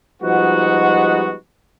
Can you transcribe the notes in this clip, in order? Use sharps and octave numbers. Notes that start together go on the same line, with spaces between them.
F3 G3 G#3 B3 D#4 F#4